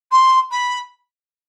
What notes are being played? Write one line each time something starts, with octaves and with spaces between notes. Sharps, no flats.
C6
B5